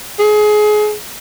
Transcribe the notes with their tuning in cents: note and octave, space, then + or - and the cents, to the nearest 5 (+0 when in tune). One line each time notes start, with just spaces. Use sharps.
G#4 +25